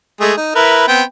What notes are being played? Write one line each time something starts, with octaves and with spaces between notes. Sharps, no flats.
G#3 A3 G#4
D#4
E4 A#4 B4
B3 C4 G5